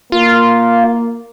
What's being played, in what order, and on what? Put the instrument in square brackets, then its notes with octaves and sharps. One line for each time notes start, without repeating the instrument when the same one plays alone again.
[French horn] A#3 [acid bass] F4